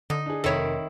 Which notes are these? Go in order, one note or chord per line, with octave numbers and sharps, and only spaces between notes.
D3 D#4
D4 G#4
F1 D#3 E4 A4 A#4 C#5